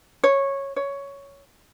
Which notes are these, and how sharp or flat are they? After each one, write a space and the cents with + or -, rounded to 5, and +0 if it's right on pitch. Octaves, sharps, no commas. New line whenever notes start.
C#5 -10
C#5 +10